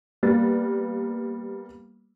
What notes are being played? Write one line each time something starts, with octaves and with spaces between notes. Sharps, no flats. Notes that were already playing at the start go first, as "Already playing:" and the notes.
G3 A#3 B3 A6